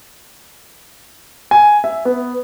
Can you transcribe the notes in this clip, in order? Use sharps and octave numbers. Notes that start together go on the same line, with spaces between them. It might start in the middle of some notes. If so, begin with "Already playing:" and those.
G#5
E5
B3